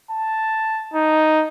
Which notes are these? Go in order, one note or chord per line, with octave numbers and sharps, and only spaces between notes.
A5
D#4